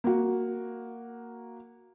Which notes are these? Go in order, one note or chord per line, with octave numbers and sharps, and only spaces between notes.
A#3 F#4